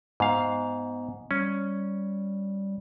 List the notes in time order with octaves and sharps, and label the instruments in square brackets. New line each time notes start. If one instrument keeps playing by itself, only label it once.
[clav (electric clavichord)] G#2 F5 [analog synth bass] B3
[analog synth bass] G3 [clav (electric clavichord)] C#4